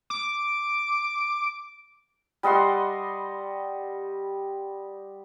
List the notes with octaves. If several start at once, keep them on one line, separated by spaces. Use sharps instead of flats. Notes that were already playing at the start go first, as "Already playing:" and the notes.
D6
G3 D#5 F#5 C6